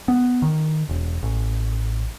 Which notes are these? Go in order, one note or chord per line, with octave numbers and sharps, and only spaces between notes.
B3
D#3
E1
A1